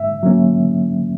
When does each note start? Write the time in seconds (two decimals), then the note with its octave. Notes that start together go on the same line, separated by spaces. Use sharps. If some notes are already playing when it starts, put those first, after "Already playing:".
Already playing: G#2 E5
0.23 F#3 A#3 C#4